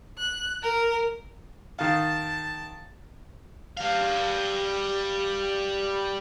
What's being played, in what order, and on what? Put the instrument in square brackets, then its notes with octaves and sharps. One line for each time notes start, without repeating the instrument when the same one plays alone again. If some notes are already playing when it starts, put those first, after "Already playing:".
[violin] F#6
A#4
[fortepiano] D#3 F5 [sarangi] A5
[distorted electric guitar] G3 F5